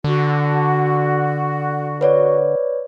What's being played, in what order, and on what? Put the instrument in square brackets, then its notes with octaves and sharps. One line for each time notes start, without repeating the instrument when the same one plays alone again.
[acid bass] D3 [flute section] F#4
[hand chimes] B4 C#5 D5